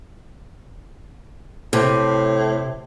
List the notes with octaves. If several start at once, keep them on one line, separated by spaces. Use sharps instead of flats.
A2 C3